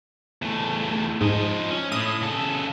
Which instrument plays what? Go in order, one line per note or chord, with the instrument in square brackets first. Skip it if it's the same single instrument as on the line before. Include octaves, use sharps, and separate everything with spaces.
[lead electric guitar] E2 A3
[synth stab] G#2 [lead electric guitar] F3 D#5
[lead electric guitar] C#4
[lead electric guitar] A2 [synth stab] D#6
[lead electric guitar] C#3 A4